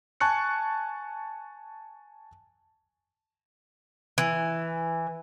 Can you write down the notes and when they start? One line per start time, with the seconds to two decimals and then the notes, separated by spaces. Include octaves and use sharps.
0.20 G#5 A5 C#6 F#6 C#7
4.18 E3